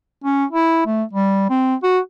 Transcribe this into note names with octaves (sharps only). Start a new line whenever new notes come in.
C#4
E4
A3
G3
C4
F#4